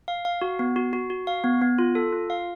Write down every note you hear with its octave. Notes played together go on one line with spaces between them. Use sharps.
F5
F5
F#4
B3
F#4
F#4
F#4
F5
B3
B3
F4
A4
F4
F5